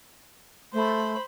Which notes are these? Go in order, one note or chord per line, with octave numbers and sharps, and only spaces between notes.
A3 C5 B5